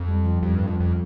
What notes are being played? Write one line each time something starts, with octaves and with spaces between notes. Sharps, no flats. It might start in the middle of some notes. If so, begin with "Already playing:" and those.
Already playing: F2
G3
F3
F2 G3
G2
F2 F3
F2